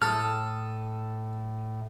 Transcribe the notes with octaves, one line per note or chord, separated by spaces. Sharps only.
A2 A4 D#6 F6